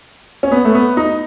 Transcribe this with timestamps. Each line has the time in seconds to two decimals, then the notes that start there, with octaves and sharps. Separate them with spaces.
0.43 C#4
0.51 B3
0.65 A3
0.75 B3
0.97 D#4